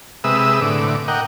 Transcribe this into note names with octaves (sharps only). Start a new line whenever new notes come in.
C3 G#3 B4 E5 D#6 E6
A2 D3 D6
A#4 D#5 F#5 G5